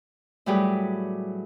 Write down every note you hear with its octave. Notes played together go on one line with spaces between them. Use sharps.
A2 F#3 G3 G4 G#4 B4